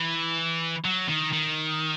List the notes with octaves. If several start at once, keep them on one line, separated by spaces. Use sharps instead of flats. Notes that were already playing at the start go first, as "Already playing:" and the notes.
Already playing: E3
F#3
D#3
D#3